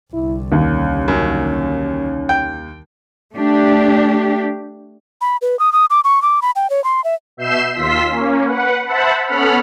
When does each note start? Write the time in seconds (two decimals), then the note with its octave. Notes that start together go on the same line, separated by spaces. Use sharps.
0.13 C2 D3 E4
0.52 D#2 C#4
1.08 F#2
2.29 G5
3.34 A3 D4 G4
5.21 B5
5.42 B4
5.59 D#6
5.73 D#6
5.90 D6
6.04 C#6
6.22 D6
6.42 B5
6.56 G5
6.70 C#5
6.84 C6
7.04 E5
7.37 B2 E5 G6 C7 E7
7.74 D#2 F4 C6 E6 B6
8.08 A#3 C#4
8.43 B4 F#5
8.85 C5 E5 F#5 A5 B5
9.26 B3 C#4 A4 F#5 B5 F6